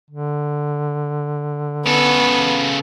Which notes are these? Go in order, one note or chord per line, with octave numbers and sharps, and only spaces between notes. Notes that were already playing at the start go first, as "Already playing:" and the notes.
D3
C#3 B3 A4